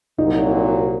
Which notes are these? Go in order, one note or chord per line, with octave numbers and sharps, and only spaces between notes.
C2 A#2 F#3 D#4